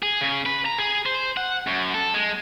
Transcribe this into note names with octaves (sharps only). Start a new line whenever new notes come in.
G#4
C#3
B4
A#5
G#4
C5
F#5
F#2
A4
G#3